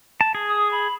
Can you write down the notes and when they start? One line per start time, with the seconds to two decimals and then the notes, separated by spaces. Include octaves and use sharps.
0.21 A5
0.35 G#4
0.49 D#6
0.71 B5